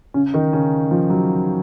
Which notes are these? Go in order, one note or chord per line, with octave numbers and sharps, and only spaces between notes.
C#3 C#4
D#3 D#4
C#3 C#4
F3
F#3